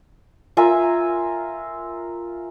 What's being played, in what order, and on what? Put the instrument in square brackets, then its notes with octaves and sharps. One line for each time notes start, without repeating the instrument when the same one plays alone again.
[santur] F4 A#4 E5 G#5